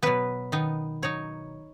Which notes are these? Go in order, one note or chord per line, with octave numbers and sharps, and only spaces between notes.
B2 F#3 B3 B4
D#3 B3 D#4
F#3 D#4 C#5